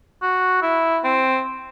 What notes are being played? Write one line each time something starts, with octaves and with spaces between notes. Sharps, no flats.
F#4
E4
C4